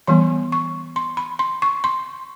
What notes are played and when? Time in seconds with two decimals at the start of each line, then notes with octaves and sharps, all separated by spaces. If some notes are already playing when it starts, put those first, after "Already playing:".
0.07 E3 G3 B3 C6
0.52 C#6
0.96 C6
1.17 B5
1.39 C6
1.62 C#6
1.84 C6